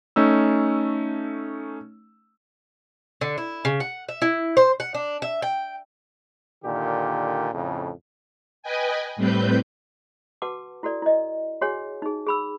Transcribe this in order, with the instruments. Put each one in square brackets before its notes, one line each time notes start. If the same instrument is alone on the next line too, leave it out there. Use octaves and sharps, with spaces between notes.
[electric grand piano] A3 C#4 D#4 E6
[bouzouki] D3
E4
C#3
F#5
E5
E4
C5
F#5
D4
E5
G5
[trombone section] A#2 D3 D#3 G4
F2 A2 C#3
[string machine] B4 D#5 G5 G#5
A2 G3 C4 B4 G6
[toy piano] F#4 B4 F#5 A5 D6
E4 F#4 A4 D5
E4 D#5
F#4 G#4 C#5 F#5 G#5
D#4 G#4
G#4 B5 E6